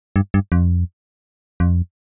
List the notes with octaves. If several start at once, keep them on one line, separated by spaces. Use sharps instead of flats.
G2
G2
F2
F2